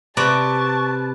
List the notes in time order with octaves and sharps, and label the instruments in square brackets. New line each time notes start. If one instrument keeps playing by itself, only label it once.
[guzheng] C3 D5 A#5 [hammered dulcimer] B4 [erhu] A5 [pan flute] C#6